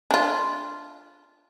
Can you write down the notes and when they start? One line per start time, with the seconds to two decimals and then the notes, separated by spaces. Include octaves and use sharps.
0.11 D4 F4